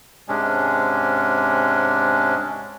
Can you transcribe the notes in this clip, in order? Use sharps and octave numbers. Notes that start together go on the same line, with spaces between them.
G#2 C3 G#3 C#4 D4